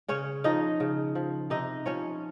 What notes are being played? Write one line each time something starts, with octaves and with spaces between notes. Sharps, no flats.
C#3 C#4 C#5
F3 D#4 D#5
C#3
F3
C3 D#4 D#5
F3 C#4 C#5